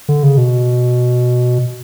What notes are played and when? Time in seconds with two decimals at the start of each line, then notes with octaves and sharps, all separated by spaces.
0.09 D3
0.23 C#3
0.38 B2